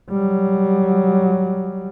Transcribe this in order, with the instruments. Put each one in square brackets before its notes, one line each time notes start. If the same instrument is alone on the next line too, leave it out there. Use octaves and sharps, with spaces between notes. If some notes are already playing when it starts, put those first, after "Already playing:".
[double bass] F#3 G3